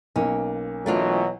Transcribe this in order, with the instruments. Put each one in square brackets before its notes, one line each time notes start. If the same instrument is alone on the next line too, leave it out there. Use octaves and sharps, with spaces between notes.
[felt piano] B1 A#3 [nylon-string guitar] C#4
[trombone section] B2 E3 F#3 [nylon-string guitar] A3 D4 F4